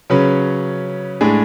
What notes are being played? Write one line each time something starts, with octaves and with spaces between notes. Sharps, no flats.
C#3 F#3 C#4 B4
A2 G#3 D4 G#4